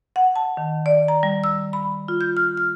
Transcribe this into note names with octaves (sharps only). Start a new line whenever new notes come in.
F#5
A5
D#3
D5
A#5
G3
E6
B5
F4
G6
F6
F6